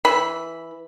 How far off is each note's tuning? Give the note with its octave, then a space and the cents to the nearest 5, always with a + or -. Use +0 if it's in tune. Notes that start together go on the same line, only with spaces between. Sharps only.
E3 +0 B5 +0